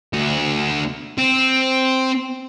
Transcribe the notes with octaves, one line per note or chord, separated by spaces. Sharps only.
D2 F#4
C4